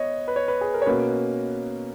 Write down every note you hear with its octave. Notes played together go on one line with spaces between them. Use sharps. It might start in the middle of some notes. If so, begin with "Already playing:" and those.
Already playing: B3 C#5 D#5
B4
C#5
B4
G#4
A#4
C#5
B2 A#3 C#4 B4